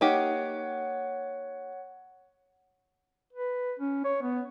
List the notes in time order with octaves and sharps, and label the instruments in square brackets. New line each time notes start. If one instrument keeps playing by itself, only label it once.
[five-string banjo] A#3 D#4 G4 [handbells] C#5 F#5
[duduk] B4
C#4
C#5
B3